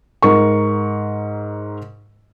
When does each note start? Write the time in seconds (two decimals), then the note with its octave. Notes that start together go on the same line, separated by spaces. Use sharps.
0.23 G#2 A#4 C#6